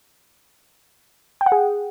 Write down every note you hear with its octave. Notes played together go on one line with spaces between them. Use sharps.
G5
F#5
G#4